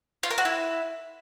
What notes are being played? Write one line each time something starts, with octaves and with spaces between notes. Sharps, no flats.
F4
A#4
F#4
E4